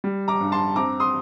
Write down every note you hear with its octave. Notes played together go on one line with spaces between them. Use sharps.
G3
A#5 D6
G2
A5 C6
C4 A#5 D6
C6 D#6